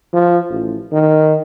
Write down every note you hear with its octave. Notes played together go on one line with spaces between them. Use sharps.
F3
A1
D#3